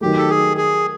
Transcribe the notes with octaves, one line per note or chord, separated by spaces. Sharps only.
D#3 F#3 A3 G4
A4
G#4
G#4